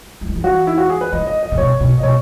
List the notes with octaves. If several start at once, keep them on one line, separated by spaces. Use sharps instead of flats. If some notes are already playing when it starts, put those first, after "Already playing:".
F#3
E3
D#3
E3 F#4
E4
F#4
G#4
B4
D#3 D#5
D#5
D#5
C#3
B2 C#5
B2
D#5
B2 C#5